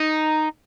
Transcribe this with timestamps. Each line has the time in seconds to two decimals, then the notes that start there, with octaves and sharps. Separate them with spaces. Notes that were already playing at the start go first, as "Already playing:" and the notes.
Already playing: D#4